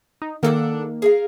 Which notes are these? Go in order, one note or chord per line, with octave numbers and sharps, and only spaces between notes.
D#4
D#3 A#3 D4 A4 F#5
G#4 A#4 F5